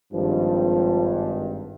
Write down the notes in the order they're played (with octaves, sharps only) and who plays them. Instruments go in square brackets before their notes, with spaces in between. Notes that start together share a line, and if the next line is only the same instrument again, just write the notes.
[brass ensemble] G#1 G2 [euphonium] F3